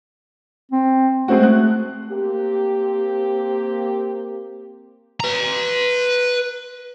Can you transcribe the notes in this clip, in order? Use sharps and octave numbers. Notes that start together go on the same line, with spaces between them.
C4
G#3 A3 C4 F#4
F#6
A#3 C4 G4
B4 A#5